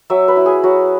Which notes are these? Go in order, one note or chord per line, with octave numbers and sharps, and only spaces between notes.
F#3 E5
B4
E4
G#4
F#3 F#4